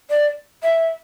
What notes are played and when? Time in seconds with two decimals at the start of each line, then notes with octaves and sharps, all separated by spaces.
0.10 D5
0.63 E5